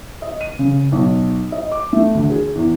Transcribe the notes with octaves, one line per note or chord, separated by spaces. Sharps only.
D#5
D#7
C#3
B1
D#5
D6
A3
D2
G#4
E2